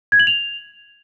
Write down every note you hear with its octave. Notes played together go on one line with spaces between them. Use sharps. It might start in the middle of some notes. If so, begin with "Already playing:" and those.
G#6
F#7
F7